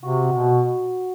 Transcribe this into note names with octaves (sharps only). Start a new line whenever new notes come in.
C3 F#4
B2